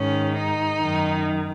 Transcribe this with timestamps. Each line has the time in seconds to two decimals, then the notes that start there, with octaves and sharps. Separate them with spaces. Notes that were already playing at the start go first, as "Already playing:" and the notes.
Already playing: G#2 D#3 C#4
0.37 D#4
0.81 F#2 D#3